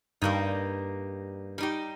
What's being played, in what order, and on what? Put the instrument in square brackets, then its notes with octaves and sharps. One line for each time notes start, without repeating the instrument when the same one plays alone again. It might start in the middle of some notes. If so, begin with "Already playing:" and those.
[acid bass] G2 [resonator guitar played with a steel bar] G3 A#3 D#4
[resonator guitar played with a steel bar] G3 D#4 G4